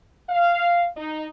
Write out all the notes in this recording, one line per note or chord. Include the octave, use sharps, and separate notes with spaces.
F5
D#4